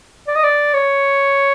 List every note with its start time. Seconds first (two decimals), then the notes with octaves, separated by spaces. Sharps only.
0.27 D5
0.35 D#5
0.44 D5
0.74 C#5